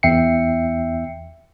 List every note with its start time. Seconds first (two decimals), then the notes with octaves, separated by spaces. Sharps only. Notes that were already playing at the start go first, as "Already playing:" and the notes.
0.03 E2 E5 G5 C7 C#7